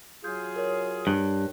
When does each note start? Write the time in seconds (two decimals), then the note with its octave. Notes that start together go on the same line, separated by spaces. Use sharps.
0.24 F#3 F4 G#4 G6
0.56 A#4 C#5
1.07 G2